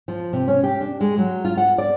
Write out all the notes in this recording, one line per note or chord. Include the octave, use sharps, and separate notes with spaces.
F3
C3
C#4
G4
D4
G#3
F#3
F4
F#5
D5